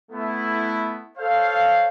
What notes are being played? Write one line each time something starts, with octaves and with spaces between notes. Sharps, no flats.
A3 B3 E4
A4 C5 C#5 F5